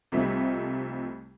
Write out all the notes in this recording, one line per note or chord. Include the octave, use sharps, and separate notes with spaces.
C2 C3 F3 G3 A3 D#4